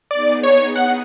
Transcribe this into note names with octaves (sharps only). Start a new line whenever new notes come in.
B3 D#4 G#4 D5
C#5
F#5